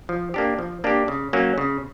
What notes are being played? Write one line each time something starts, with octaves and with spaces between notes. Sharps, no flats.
F3
A#3 D4 G4
F3
A#3 D4 G4
C#3
F#3 A#3 C#4
C#3